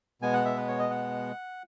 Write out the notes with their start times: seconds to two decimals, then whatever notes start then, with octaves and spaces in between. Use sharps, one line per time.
0.22 B2 G#3 B3 G#5
0.33 F#5
0.45 E5
0.56 B4
0.68 C#5
0.79 D#5
0.90 F#5